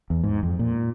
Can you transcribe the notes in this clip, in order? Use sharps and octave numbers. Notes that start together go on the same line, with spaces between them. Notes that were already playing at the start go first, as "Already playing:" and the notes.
E2
G#2
F2
A#2